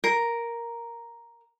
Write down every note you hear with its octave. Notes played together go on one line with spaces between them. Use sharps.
A#4